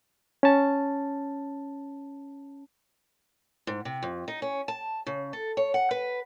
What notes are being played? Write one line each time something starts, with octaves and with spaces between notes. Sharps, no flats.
C#4 A5
G#2
C3
F2
D#4
C#4
A5
C#3
A4
C#5
F#5
B4